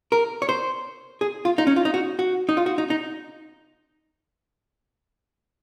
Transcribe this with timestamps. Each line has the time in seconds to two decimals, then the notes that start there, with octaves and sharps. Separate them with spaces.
0.12 A#4
0.42 C#5
0.49 C5
1.21 G#4
1.45 F4
1.58 D#4
1.67 C#4
1.76 F4
1.85 D#4
1.94 F#4
2.19 F#4
2.49 D#4
2.57 F4
2.66 F#4
2.78 D#4
2.90 D#4